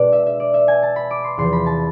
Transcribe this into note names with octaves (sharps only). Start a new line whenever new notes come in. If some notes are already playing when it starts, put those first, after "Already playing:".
Already playing: B2 G#3 D4 D5
E5
E5
D5
E5
G#5
A5
B5
D6
C6
E2 C3 F3 C6
B5
A5